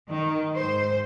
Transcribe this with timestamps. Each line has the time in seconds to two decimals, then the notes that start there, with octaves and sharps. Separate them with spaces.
0.10 D#3
0.55 G#2 C5